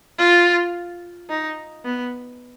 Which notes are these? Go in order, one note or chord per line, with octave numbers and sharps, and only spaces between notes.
F4
D#4
B3